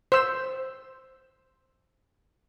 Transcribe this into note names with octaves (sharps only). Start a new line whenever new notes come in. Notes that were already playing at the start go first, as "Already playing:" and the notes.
C5 E6